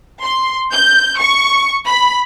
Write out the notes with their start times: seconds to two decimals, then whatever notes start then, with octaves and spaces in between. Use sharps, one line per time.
0.22 C6
0.73 G6
1.19 C#6
1.86 B5